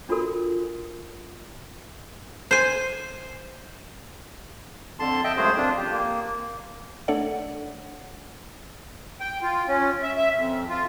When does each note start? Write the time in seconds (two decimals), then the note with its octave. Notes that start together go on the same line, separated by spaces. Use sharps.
0.09 D4 F4 F#4 A4 A#4
2.51 C5 G#5
5.00 F2 D3 A5 C6
5.24 D#5 E5 G5 A5
5.36 F#2 C#3 G#3 A3 G#4 C5
5.57 F2 D4 F4
5.77 G4
5.92 A#3
7.08 A3 D4 A4 C#5 D5 F#5
9.20 G5
9.42 F4
9.68 C#4
10.02 E5
10.16 E5
10.36 F2
10.69 F4